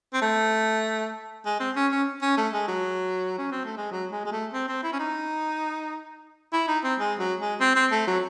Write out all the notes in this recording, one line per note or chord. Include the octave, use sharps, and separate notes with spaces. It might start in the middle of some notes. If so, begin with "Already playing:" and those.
C4
A3
G#3
C4
C#4
C#4
C#4
A3
G#3
F#3
C#4
C4
A3
G#3
F#3
G#3
G#3
A3
C4
C4
E4
C#4
D#4
E4
D#4
C4
G#3
F#3
G#3
C4
C4
A3
F#3